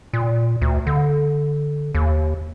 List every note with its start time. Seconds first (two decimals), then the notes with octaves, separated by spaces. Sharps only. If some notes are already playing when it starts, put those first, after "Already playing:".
0.13 A#2
0.62 D2
0.87 D3
1.95 D#2